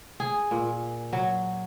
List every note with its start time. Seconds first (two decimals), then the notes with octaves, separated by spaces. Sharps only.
0.20 G#4
0.51 A#2
1.13 F#3